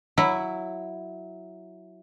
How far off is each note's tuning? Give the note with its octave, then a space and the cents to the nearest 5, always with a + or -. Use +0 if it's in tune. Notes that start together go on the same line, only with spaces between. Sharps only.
F#3 +0 E4 +0